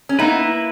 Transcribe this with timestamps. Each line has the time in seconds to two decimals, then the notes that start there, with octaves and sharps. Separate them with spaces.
0.09 C#4
0.19 A#3 B3 D#4 E4 B4